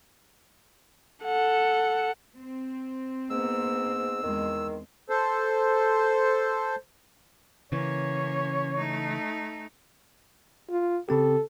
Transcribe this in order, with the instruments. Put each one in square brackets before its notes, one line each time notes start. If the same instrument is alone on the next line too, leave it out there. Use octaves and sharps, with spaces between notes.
[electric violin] A4 F#5
[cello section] C4
[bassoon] G#2 [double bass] A#3 B3 [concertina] E6
[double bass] E2 G#3 [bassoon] D#3
[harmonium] A4 C5
[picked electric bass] C#3 E3 [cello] A#3 C#4 [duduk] C#5
[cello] A3 D#4
[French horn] F4
[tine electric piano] C#3 C4 G4 [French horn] A4